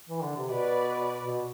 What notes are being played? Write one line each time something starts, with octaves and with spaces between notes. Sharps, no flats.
E3
D3
C3
B2 B4 D5
B2